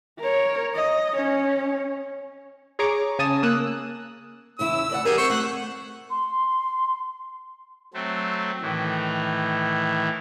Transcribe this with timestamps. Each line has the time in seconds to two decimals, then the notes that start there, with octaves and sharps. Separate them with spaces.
0.19 A#4 C#5
0.75 D#5
1.14 C#4 C#5
2.79 G#4 C#5 A#5 C#6 D6
3.19 C#3 G#5 A5 D#6 E7
3.43 A#3 D#6 E6 F#6
4.59 E2 C#3 E4 E6
4.90 D2 D5 F#5
5.05 E3 G3 G4 G#4 A#4
5.18 C4 C5 C#6 E6
5.30 A3 F#5
6.10 C6
7.94 F#3 A3 C4
8.62 A2 D#3 E3